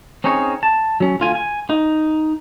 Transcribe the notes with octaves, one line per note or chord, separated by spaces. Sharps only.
C4 C#4 D#4 G#4 C#5
A5
F#3 C#4
D2 F4 G#5
G#5
D#4